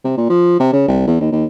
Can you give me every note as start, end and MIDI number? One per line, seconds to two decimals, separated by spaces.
0.04 0.16 48
0.17 0.26 46
0.30 0.58 53
0.60 0.70 48
0.73 0.88 49
0.88 1.06 36
1.07 1.18 40
1.21 1.29 39
1.32 1.45 39